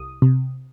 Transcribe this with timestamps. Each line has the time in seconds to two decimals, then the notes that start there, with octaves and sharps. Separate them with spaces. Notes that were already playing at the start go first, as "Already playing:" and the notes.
Already playing: C2 D#6
0.22 C3